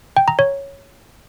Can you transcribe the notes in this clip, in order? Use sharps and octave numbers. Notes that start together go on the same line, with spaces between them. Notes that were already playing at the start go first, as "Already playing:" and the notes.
G5
A#5
C#5